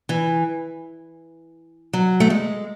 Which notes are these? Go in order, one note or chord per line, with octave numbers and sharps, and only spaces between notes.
E3
F#3
A3
G#3